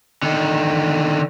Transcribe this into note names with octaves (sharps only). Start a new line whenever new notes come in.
D3 D#3